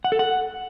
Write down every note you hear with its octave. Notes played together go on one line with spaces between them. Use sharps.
F#5
A4
F#5